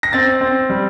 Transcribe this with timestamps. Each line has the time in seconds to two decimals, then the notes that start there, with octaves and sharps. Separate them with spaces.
0.03 A#6
0.13 C4 A6
0.41 C4
0.70 G3